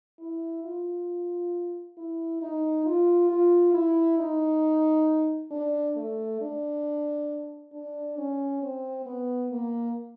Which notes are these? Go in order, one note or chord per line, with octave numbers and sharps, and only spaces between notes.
E4
F4
E4
D#4
F4
F4
E4
D#4
D4
A3
D4
D4
C#4
C4
B3
A#3